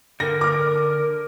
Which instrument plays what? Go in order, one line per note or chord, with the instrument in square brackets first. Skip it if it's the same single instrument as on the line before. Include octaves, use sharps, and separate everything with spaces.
[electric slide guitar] D3 [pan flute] A#4 [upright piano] A#6
[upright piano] D6 F6